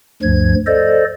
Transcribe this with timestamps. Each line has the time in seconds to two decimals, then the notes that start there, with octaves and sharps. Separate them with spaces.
0.22 D2 G2 F3 G#6
0.67 A4 C5 D5 D#5